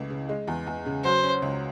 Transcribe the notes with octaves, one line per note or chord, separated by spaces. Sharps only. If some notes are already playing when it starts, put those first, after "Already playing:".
Already playing: C#2 E3 A3
C#3
G#3
E2
E2
C#3
F#3 C5
C#4
C#2